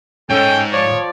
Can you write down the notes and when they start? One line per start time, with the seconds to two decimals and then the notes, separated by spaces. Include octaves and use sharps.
0.30 G#2 C#4 A4 G5
0.73 F3 C#5 D5